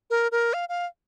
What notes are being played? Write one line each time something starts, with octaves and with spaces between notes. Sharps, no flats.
A#4
A#4
F5
F5